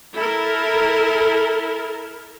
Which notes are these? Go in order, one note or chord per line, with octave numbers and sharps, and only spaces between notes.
E4 A4 A#4